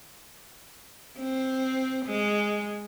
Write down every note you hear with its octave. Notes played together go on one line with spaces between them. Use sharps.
C4
G#3